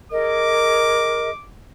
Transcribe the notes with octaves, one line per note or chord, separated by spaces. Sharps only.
G#4 A#4 D#5 D6